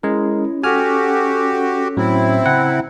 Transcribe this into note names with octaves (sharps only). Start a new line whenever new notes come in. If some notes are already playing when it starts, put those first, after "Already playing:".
G#3 C#4 E4 A#4
F#4 G4 A4 G#5 F6
A2 F#3 C4 E4
C#3 F#5 G5 A#5